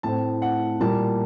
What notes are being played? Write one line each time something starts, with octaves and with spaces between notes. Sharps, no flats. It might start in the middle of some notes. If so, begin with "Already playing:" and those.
A2 A3 C4 A5
F#5
A#2 G3 A#3 A5